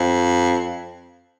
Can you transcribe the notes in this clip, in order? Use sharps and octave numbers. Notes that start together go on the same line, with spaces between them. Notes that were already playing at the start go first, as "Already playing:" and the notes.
Already playing: F2